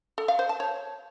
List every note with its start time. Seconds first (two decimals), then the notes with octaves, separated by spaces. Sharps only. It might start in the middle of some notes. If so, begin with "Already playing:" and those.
0.18 A4
0.28 F5
0.39 C5
0.49 A5
0.60 C#5